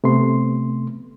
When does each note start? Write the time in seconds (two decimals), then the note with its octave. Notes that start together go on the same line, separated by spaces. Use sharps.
0.04 C3 A3 B3 C6